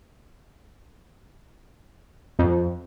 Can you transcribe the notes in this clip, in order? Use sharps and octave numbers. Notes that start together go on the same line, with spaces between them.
F2